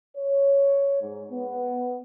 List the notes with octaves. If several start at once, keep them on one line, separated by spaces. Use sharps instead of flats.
C#5
G#2
B3